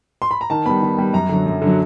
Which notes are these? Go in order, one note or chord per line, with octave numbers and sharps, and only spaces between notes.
C6
B5
A#5
D#3 A5
G3 B3 B5
D#3
G3 B3
F#2 A#5
D3 F#3
F#2
D3
F#3